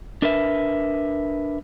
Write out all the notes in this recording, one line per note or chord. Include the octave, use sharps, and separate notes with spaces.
D4 A#4 B4 E5